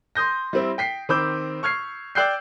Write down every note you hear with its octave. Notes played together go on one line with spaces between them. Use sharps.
C6 D#6 G6 A#6
G3 C4 E4
G5 B6 C7
D#3 C4 B5 D6 E6 G6
C#6 F6 G#6 C7
D5 G5 E6 F#6 G6 C7